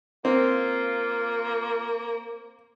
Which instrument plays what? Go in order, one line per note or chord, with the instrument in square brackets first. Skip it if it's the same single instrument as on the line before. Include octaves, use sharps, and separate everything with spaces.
[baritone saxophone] A#3 [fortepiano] C4 [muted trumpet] F4